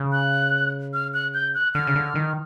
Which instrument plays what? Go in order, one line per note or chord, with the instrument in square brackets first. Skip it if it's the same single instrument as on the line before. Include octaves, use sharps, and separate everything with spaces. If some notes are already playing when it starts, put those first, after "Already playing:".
Already playing: [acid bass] C#3
[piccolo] F#6
F6
F#6
G6
F#6
[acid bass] D3 [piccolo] F6
[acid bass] C#3
D3
D#3